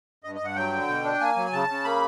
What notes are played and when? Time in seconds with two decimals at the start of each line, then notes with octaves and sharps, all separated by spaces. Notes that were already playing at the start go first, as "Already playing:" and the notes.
0.24 G2 D#5
0.35 D#5
0.40 G2 F#5
0.56 F#3 G5
0.72 D3
0.88 B2
1.04 D4
1.20 A#3 G#5
1.36 F#3
1.53 C#3 A5
1.68 C#3
1.85 A#3 B5